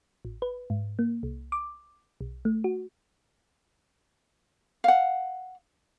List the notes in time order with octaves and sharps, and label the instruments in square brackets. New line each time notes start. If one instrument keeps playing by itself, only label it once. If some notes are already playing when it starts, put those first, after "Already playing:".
[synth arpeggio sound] A1
B4
G#2
A#3
C2
D6
B1
A3
F#4
[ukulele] F5 F#5